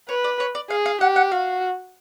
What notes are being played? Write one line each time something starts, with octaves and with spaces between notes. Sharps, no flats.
B4 C#5
D5
C#5
D5
G#4 F5
F5
G4 F#5
F#5
F#4 F5